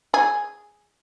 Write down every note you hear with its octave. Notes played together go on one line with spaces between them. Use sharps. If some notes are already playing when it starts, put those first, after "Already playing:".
G#4